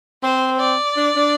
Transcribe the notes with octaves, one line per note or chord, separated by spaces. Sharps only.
C4 C5
D5
D4
D4